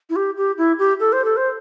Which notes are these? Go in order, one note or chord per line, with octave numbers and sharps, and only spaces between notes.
E4
G4
G4
E4
G4
A4
C5
A4
C5